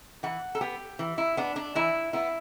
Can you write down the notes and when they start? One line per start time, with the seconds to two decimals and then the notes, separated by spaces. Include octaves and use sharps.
0.23 E3 F#5
0.55 A4
0.61 B3 G4
0.99 E3
1.18 E4
1.37 B3 D4
1.56 D4
1.75 E3 E4
2.13 B3 E4